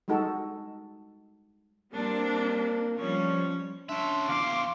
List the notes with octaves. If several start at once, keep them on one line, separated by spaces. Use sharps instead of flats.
G3 G#3 D#4 F#4 A4
G3 A#3 C4 D4
F3 G3 C#4 C#5
C#4 D4 E5 C6
E2 C5 F5 D6